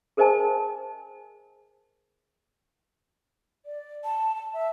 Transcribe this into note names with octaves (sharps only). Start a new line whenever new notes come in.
G#4 A#4 C5 D#5 G#5 A5
D5
A5
A5
E5